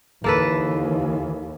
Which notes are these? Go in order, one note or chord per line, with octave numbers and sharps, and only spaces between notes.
D#2 D3 E3 A#3 A4 B4